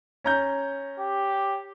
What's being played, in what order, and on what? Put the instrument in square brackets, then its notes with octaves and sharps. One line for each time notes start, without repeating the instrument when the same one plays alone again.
[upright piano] C#4 A#5 G6
[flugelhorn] G4